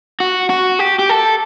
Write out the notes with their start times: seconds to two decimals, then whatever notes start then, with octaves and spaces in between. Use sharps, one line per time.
0.20 F#4
0.50 F#4
0.79 G4
0.99 G4
1.09 A4